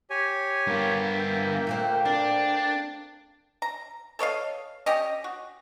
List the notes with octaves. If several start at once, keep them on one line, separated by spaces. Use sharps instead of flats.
G4 C#5 G#5
G2 A#3 B3 G5
E5
A#2 A3 C4
C4 D4 D5
A#5
A4 C#5 D#5 F5
C#4 G4 D#5
F#4